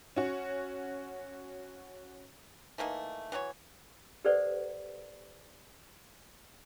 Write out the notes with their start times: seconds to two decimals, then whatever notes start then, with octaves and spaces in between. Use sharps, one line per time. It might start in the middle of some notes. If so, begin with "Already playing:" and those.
0.16 C#4 F#4
2.78 E3 A3 A#3 D#4
3.32 E3 F#3 G4 C#5
4.25 G4 A4 B4 C5 D5 F#5